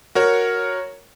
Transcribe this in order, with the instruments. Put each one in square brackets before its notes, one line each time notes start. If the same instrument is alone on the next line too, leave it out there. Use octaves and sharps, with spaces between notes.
[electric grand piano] F#4 A#4 C#5